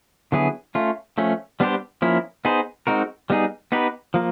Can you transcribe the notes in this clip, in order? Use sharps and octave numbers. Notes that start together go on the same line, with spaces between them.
D3 F#3 B3 E4 G#4
A3 C#4 F4
F3 A3 C#4
G3 B3 D4 G4 C5
F3 A#3 C#4 E4
B3 D#4 G#4 C5
G#3 C4 D#4 F#4 A#4
G3 B3 D#4 G#4
B3 D#4 G4 B4
F3 A#3